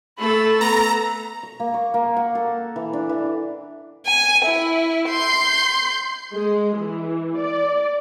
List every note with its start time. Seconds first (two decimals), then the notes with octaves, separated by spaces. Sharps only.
0.18 A3 A4 B5 E6
0.61 B3 A#5
1.43 C#6
1.60 A#3
1.74 C#6
1.94 A#3
2.17 F#5
2.35 A4
2.76 E3
2.93 D4
3.09 E3
4.06 G#5
4.45 E4
5.09 C6 G6
6.34 G#3
6.79 E3
7.39 D5